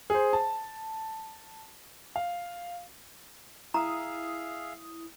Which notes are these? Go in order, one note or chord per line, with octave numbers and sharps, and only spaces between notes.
G#4 C5
A5
F5
E4 G#4 E5 F5 A#5 D#6